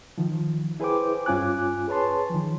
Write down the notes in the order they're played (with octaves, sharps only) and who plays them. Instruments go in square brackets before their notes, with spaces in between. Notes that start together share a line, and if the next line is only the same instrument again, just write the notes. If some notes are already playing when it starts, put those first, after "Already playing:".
[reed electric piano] D#3 F3
E4 G#4 B4 C5 G5 D6
G2 C#4 F4 G#5 D6 F#6
G#4 B4 C#5 A5 C6
D#3 F3